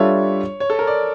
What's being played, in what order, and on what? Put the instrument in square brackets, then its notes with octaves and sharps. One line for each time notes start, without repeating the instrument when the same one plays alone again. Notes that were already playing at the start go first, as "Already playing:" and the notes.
Already playing: [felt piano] G3 D4 F4 A4 E5 [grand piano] C#5
[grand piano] C#5
A4
A#4
D5